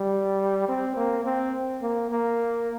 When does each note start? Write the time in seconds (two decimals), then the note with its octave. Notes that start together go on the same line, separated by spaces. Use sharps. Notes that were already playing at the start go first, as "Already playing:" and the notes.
Already playing: G3
0.69 C4
0.96 A#3
1.25 C4
1.82 A#3
2.11 A#3